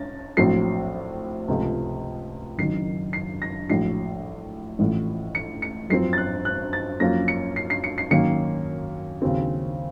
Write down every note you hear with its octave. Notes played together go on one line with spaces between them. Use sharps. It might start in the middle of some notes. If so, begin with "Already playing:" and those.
Already playing: C#4 A6 A#6
A#1 A2 F#3 C4 C7
C#2 C3 F3 A3
F#1 F#2 D#3 C7
C7
A#6
A#1 A2 F#3 C7
A1 A2 F3
C#7
C#7
F#2 F3 C4 C7
A6
F#6
F#6
A6
F#2 F3 A#3 C#4 A#6
C#7
C7
C7
C#7
C7
F#2 D#3 A#3 C#4 C#7
D#2 C#3 F#3 C4